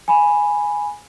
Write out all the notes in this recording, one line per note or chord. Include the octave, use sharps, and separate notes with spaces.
G#5 B5